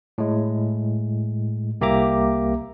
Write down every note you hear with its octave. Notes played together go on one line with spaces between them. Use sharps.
A2 G#3
C2 A#3 G4 E5 A#5 D6